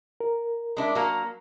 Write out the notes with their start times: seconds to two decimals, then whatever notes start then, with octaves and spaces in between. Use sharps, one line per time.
0.20 A#4
0.77 G#3 D4 E4
0.95 F#3 A#3